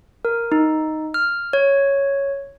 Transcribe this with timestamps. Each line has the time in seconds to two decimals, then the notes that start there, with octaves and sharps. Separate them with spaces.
0.25 A#4
0.52 D#4
1.14 F6
1.53 C#5